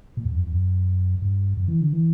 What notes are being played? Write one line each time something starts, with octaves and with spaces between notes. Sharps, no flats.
A#2
E2
F#2
E2
F#2
G2
F#2
E3
D3
E3